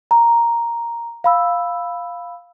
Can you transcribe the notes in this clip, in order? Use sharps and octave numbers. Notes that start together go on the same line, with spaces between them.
A#5
F5 B5 E6